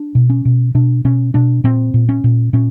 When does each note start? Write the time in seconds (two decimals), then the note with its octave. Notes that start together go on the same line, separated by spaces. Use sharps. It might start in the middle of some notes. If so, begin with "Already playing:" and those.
Already playing: D4
0.15 B2
0.30 C#4
0.45 B2
0.75 B2 D4
1.05 B2 C#4
1.34 B2 D4
1.64 A#2 C4
1.94 A#2
2.09 C#4
2.24 A#2
2.53 A#2 C#4